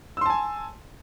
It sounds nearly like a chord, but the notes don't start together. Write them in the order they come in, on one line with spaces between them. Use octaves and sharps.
E6 C6 A5 G#5